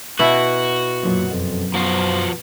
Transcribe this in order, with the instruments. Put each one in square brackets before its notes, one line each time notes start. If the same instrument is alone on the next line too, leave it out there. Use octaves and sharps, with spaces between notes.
[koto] B2 E4 [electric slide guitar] F#4
[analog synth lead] F#2 [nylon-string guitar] A#2 F3 F#3
[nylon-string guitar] F2
[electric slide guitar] F3 F#4 C5 [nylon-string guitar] B3